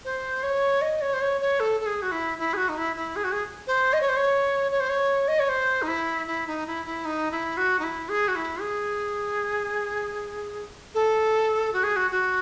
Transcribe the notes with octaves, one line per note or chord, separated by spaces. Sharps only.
C5
C#5
D#5
C#5
C5
C#5
C#5
A4
A4
G#4
F#4
E4
E4
G#4
F#4
D#4
E4
E4
G#4
F#4
G#4
C5
D#5
C#5
C5
C#5
C#5
C5
C#5
D#5
C#5
C5
D#4
E4
E4
D#4
E4
E4
D#4
E4
F#4
D#4
E4
G#4
F#4
E4
G#4
A4
F#4
G#4
F#4
F#4